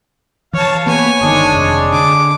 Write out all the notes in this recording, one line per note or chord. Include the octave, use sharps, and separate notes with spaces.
E3 C#5 F5 A5
A#3 B3 B4 C#5 G#5
G1 D#3 G#3 D4 G#4
F1
D3 D6